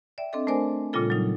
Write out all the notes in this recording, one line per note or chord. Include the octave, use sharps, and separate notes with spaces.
D5 E5 G5
C4 D4 A4 D#5
A3 D4 A#4 C5 D5 G#5
A#2 C#3 G3 F4 A4
F#3 G3 D#4